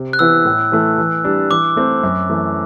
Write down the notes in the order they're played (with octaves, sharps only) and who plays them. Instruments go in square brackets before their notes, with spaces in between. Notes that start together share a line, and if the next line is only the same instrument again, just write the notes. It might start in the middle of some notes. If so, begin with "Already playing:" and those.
Already playing: [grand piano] C3
[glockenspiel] F#6
[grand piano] E3 B3 E4 [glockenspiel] E6
[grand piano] A2
E3 A3
E3
G3 D4
[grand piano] E3 [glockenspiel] D6
[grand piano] A3 C4
F#2
E3 A3